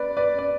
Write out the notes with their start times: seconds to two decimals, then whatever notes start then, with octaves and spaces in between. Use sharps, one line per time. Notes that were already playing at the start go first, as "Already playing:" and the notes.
Already playing: B4 D5
0.17 B4 D5
0.39 D5